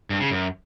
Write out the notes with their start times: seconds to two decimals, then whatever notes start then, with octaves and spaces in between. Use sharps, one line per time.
0.10 G2
0.20 C#3
0.31 F#2